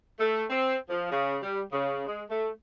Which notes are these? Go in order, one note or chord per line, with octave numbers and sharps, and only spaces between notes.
A3
C4
F3
C#3
G3
C#3
G#3
A3